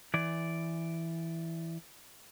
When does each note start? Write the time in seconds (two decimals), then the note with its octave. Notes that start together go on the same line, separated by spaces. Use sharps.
0.14 E3 D5